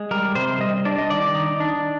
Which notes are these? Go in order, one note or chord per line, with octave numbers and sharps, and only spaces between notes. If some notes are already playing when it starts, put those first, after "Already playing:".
Already playing: G#3
G3 A#4
C3 C5
G3 D#5
D4 D5
D#5
D#3 D5
D#4
D4